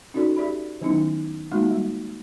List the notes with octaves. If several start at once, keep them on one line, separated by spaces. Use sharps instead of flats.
C#4 D#4 F#4 A4 D5
G4 D5 E5 B5
D#3 F#3 B3 C#4 D#4 E4
G#3 A#3 D#4 F4 F#4
G3